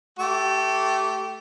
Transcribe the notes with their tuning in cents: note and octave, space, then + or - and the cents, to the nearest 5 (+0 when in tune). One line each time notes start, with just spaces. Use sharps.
A3 +0 G4 -25